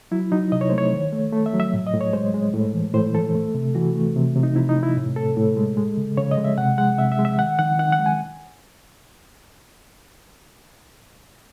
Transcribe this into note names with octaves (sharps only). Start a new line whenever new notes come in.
F#3 E4
F#3 D#4
C3 D#5
C#5
A3 C5
C#5
D#3
A3
A3
E5
F#3
E5
A2
D#5
A2
C#5
G#3 C5
G#3
A2
E3
A2 C5
E3 A4
A3
C3
E3 F#4
A3
C3
C3
D#4
C3 E4
D#4
C3
E4
A2
A2 A4
A2
G#3
G#3
C#3
C#3 C#5
D#5
G#3
E5
C3 F#5
G#3 F#5
C3 E5
E5
G#3
E5
D#3 F#5
D#3 F#5
D#3 F#5
F#5
G#3
G#5